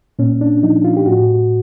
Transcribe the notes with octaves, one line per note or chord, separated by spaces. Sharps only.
A#2 C#4
D4
F3 D#4
F4
G4
A2 F#4